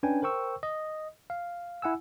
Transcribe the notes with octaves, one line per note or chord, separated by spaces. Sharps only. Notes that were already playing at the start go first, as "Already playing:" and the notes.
C#4 D4 B4 G5 G#5
A#4 C5 G5 C#6 E6
D#5
F5
E4 F#5 G#5 E6